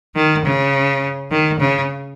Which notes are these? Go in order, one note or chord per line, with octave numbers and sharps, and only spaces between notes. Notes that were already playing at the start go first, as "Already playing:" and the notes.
D#3
C#3
D#3
C#3